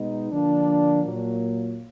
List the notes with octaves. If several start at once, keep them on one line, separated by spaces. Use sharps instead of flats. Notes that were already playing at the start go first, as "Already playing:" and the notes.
Already playing: B2 G#3 B3 D#4
D3 F3 A#3 D4
A#2 F#3 A#3